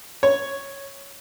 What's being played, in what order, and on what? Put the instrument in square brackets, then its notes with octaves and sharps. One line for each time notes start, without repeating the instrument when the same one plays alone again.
[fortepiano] C#5